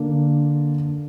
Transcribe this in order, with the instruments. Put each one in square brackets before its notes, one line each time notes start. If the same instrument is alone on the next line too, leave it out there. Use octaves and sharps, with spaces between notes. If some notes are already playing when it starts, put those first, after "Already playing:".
Already playing: [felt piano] D3 A#3 D4